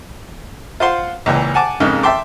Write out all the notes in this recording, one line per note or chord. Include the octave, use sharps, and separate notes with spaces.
F4 C5 F#5 C6
C#2 A#2 E3
F#5 G#5 A5 D6
F2 G#2 C#3 A#3 D#4
E5 G5 A5 C6 D6